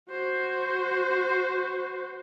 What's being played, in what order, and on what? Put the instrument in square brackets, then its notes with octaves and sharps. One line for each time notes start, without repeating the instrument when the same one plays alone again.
[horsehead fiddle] F#4 C5